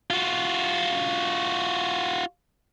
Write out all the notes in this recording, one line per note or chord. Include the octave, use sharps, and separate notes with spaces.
F4 F#4